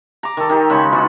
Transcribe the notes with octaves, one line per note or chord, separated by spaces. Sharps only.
A#5 D6
D#3 A4
D#3 D#4 G4
C#3 G#3 C#5 B5
B3 D#4 F4 F#4